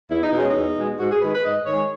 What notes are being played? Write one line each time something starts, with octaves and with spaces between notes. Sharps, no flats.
E2 E4
D#4
B2 G#3 C#4
E2 D#4
B2 G#3
G#2 F#4
G#4
D#3 G#3 B4
B4
G#2 D#5
D#3 G#3 C#5